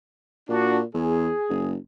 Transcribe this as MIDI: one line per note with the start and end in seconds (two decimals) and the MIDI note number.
0.49 0.83 46
0.49 0.79 62
0.49 0.79 66
0.94 1.30 40
0.94 1.70 68
1.49 1.76 30